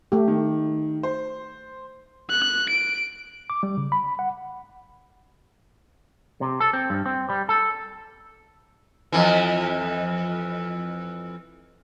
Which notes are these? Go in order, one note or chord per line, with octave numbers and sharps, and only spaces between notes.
A3 G4
D#3
C5
F#6
D7
D6
G3
C#3
B5
F#5
C3
A4
C4
G2
C4
G3
A4
F2 E3